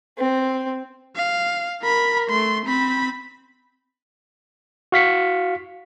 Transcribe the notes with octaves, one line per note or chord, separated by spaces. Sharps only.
C4
F5
A#4 B5
A3 C6
C4 B5
F#4 F5 B6 C#7